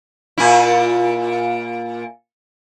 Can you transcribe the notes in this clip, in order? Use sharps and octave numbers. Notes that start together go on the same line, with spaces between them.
A#2 E4